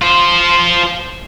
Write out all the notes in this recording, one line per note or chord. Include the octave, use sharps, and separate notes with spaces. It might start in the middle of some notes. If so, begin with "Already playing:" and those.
F4 C5